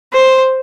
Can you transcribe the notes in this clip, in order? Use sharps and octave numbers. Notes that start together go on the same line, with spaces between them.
C5